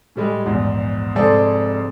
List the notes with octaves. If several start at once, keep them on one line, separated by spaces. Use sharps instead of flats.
A2 G3 G#3
A#1 E2 G#2
F1 G#2 G#4 A4 C5 D5